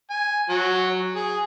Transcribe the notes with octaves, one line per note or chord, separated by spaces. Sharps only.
G#5
F#3
G#4